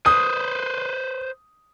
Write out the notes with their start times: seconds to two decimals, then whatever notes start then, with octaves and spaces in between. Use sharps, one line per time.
0.06 B4 C5 D#6